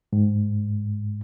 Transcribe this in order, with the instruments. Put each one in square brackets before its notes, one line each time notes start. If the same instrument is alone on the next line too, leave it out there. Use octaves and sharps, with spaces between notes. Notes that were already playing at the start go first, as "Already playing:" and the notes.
[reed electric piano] G#2